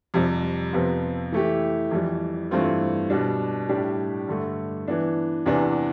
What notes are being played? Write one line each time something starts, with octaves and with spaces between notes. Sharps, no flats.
F2 C3 G3
F2 C3 F3 B3 F4
E3 A3 E4 G4
F2 E3 G3
G2 E3 A3 C4 F4
B2 G3 D4
A2 G3 D4 G4
G2 D3 A3
E3 B3 D4
E2 C3 E3 B3 D4